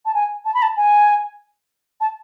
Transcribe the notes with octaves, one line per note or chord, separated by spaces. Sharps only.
A5
G#5
A5
B5
A5
G#5
A5